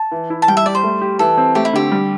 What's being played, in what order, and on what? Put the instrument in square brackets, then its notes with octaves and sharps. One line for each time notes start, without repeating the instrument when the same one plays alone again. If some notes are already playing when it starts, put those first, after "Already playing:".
Already playing: [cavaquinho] A5
[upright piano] E3
E4
[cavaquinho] A5
[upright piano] G3 [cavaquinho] G5
[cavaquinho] E5
[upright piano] G4 [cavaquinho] D5
[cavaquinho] C5
[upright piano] A3
G4
[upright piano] E3 [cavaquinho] A4
[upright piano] C4
[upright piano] A3 [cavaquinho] G4
[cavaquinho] E4
[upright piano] D3 [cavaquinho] G4
[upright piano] G3